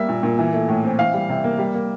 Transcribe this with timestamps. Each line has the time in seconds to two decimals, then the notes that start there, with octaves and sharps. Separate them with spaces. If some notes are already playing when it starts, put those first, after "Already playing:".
Already playing: G3 A#3 E5
0.09 A#2
0.23 A#2
0.39 E3
0.53 A3
0.69 A2
0.84 C4
0.99 E3 F5
1.14 G3
1.29 C3
1.44 A#3
1.59 G3
1.75 A#3